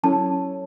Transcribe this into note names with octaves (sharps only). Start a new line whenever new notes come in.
F#3 C#4 E4 A4 C#5 A5